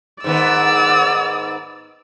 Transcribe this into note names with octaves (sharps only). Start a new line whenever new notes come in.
G#2 D#3 B3 D5 E6